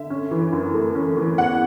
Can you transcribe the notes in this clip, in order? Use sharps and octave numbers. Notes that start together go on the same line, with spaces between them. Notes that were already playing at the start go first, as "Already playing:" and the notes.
Already playing: D3 E5
C#4
E3
F#2
A3
C#4
E3
E2 F#5